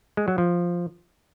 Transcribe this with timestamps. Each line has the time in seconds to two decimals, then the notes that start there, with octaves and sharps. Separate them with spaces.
0.17 G#3
0.28 F#3
0.38 F3